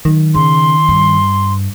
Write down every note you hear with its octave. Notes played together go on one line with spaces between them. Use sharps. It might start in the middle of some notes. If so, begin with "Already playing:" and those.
D#3 F#3
C#3 C6
G2